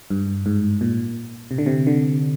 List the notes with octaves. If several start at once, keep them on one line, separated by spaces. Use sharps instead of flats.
G2
G#2
A#2
C3
D3
C3
D3